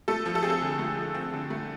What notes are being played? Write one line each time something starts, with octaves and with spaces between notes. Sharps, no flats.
A3 A4
F3
A4
C4 G#4
A4
D3
A3
F3
C4
D3
A3